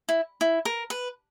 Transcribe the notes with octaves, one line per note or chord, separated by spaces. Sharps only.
E4
E4
A#4
B4